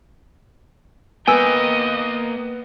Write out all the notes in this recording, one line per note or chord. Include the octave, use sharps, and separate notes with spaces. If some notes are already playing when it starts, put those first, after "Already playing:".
A#3 B3 D#5 G5 G#5 E6